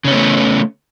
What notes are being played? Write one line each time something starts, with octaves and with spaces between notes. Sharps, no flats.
C#3 A3 B3 C#4